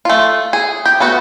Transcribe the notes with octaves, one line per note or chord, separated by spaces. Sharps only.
A3 F4
G#4
G4
A3 B3 F#4